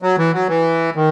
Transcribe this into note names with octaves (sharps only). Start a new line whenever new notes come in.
F#3
E3
F#3
E3
D#3